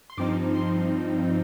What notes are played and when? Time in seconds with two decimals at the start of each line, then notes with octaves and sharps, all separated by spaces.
0.10 C6
0.17 G2 F3 C4 D#4 D6
0.55 C6